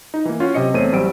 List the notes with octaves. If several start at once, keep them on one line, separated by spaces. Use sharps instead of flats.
D#4
E3 A#3
C#4 F4 F#4
C3 F#3 D#5 C#7
E2 A3 C4 C#5 D#7
A1 F#3 G3 C5 E6 D7